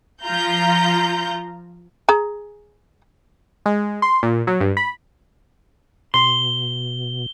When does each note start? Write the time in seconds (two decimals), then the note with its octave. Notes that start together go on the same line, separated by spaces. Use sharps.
0.24 F3 F4 A#5 G6
2.09 G#4 A#5
3.66 G#3
4.02 C6
4.23 A#2
4.47 F#3
4.60 G2
4.77 B5
6.14 B2 C6 G7